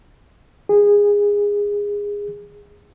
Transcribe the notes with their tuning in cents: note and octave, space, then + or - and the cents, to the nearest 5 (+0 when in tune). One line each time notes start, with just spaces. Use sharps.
G#4 -20